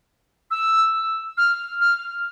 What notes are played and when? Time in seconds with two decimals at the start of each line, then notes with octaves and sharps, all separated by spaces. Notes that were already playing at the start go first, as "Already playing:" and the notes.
0.51 E6
1.38 F6
1.81 F6